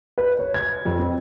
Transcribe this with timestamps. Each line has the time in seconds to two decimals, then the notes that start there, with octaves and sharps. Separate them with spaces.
0.18 B4
0.39 C#5
0.54 G#6
0.85 F2
0.99 C4